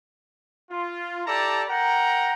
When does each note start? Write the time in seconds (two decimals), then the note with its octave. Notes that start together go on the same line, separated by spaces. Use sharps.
0.70 F4
1.25 E4 G4 A4 D5 A5 A#5
1.68 A#4 F#5 G5 A#5